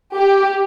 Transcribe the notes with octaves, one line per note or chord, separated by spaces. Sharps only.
G4